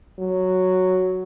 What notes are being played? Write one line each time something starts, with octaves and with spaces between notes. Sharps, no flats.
F#3